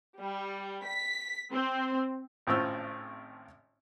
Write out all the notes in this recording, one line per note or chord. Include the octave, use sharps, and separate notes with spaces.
G3
B6
C4
G#1 A2 C#3 C4 F4 E6